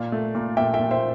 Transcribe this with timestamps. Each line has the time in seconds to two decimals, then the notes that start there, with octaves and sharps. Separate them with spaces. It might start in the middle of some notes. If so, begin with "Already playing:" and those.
Already playing: A#2 D5 F5
0.12 A3
0.35 A#2
0.57 A#2 E5 G5
0.74 E5 G5
0.80 A#2
0.91 C5 E5